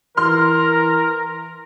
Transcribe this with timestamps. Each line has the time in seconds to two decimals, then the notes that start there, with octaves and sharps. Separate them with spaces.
0.17 E3 A#4 C6 F6